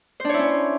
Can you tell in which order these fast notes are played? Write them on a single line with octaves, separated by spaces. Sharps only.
C5 D4 C#5 E4 C#4